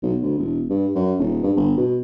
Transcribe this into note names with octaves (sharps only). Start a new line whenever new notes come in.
B1
D2
E1
G2
F#2
D#1
G2
G1
B2